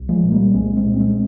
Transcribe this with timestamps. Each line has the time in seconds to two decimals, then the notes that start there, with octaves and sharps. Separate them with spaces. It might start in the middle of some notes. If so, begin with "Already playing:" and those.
Already playing: C2
0.09 F3 G#3
0.23 A#2
0.31 G3 A#3
0.54 C2 G#3 C4
0.77 G#3 C4
0.85 A#2
0.96 C#4
1.00 G#3 C4